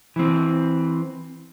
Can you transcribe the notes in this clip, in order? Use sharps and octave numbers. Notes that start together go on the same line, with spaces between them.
E3 C4